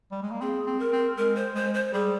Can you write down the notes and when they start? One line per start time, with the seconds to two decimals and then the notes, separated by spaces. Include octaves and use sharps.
0.11 G3
0.22 G#3
0.31 A#3
0.41 C4 G#4
0.66 C4
0.80 A#4
0.92 C4
1.17 G#3 A#4
1.36 C5
1.55 G#3 C5
1.74 C5
1.93 G3 G#4